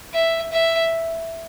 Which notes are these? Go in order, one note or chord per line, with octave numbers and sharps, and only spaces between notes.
E5
E5